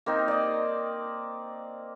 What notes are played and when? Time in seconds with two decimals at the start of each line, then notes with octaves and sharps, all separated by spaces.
0.06 A#3 C4 D#4
0.28 D5 D#5